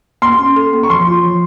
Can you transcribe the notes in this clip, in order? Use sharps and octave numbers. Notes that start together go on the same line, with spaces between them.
A#3 C6
C#4
A4
A#3
C#6
F3 C6
F4
F3